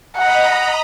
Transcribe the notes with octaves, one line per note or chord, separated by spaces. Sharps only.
D#5 F#5 A#5 B5